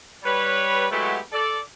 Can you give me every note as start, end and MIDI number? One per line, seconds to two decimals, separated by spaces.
0.24 0.85 55
0.24 0.85 71
0.24 0.85 73
0.91 1.19 54
0.91 1.19 56
0.91 1.19 57
0.91 1.19 59
0.91 1.19 64
0.91 1.19 67
1.32 1.58 69
1.32 1.58 74